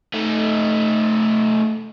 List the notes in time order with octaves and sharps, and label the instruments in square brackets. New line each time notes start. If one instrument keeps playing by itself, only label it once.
[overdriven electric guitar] A3 D#4